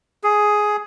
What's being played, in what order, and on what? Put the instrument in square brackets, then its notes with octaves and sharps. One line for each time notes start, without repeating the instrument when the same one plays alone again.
[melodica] G#4